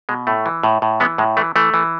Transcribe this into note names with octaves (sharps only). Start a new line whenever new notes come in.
B2 G#3
A2 A3
E3
A2
A2
E3 G#3 B3
A2 G#3
E3 A3
E3 A3
E3